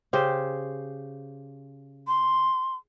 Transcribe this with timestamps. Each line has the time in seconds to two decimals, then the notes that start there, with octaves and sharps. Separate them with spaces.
0.13 C#3 G4 C5
2.08 C6